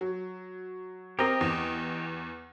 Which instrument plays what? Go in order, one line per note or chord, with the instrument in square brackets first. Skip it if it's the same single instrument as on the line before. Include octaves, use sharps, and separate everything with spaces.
[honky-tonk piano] F#3
[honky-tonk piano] C4 A#4 [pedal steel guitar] G4 D#5
[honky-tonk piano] E2